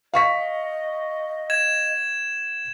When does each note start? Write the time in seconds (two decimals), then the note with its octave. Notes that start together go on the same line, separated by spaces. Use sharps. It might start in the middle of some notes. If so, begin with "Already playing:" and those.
0.14 D#5 F5 C#6 B6
1.50 G#6 E7